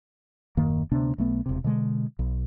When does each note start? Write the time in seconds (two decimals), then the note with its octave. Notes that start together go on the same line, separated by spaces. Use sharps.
0.57 D#1 F#2 D#3 A#3
0.92 D2 C3 B3 D4
1.18 B1 A3 B3
1.46 E1 C3
1.64 B2 D3 G#3
2.19 B1